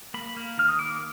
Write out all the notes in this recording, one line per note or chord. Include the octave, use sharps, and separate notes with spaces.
A#3 B5
A#3
D#3 F6
D#6
A#3 D6